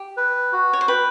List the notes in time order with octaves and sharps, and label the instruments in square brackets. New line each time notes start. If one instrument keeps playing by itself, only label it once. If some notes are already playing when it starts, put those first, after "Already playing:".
Already playing: [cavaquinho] G4
[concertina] B4
F#4
[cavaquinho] C#5
C5
[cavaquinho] B4 [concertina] G5